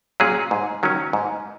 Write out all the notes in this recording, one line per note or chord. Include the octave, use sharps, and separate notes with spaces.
A#2 F#3 C#4 G#4
G#2
D#3 F#3 C#4
G#2